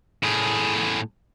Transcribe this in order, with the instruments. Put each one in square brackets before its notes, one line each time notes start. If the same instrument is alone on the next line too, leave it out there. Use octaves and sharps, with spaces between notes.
[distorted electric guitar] A2 G#4